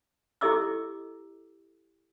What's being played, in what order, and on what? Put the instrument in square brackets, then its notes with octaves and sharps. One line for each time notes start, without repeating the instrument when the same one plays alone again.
[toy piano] E4 G4 A4 D#5 D6 E6